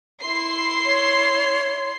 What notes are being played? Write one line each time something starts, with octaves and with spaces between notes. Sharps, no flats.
E4 C6 C7
C#5